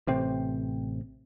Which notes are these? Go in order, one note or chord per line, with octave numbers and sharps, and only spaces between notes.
A1 C3 C4